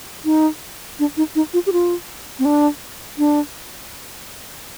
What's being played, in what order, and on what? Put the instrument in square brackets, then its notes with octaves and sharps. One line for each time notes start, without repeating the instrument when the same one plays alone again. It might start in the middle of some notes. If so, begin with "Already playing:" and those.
[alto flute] D#4
D4
D#4
D#4
F4
G4
F4
C4
D4
D4